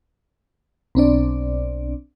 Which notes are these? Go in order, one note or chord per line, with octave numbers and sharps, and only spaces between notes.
B1 C4 D4 D5